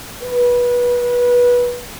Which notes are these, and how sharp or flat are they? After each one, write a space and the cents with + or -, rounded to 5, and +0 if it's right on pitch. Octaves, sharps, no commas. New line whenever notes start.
B4 -20